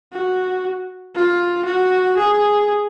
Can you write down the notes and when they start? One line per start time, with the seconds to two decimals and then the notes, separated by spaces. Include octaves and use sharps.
0.13 F#4
1.15 F4
1.65 F#4
2.17 G#4